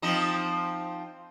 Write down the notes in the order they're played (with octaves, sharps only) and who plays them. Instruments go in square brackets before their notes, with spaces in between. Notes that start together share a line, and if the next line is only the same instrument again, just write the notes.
[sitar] F3 C4 D#4